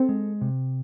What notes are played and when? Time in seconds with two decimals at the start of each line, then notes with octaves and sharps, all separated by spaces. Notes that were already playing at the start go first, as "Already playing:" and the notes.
Already playing: C4 A4
0.09 G#3
0.41 C3